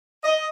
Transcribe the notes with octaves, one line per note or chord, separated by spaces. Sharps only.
D#5